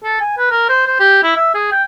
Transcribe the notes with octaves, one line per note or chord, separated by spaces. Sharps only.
A4
G#5
B4
A#4
C5
C5
G4
E4
E5
G#4
G5